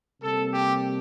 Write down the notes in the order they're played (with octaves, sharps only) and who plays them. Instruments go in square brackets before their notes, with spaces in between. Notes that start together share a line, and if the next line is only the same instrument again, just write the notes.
[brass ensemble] C3 G3 A#3 A4
G4